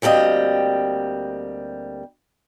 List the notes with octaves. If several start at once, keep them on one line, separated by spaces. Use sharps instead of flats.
D2 G3 A#3 C4 D#5